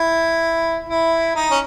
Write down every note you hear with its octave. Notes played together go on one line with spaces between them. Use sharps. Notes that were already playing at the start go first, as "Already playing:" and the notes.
Already playing: E4
E4
D#4
C#4